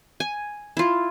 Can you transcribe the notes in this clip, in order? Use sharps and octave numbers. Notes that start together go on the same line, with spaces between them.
G#5
E4 F4